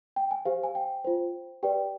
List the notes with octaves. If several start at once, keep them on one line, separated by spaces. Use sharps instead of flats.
G5
G#5
G4 C5 F5
G#5
G5
F4 C5
G4 B4 D5 G5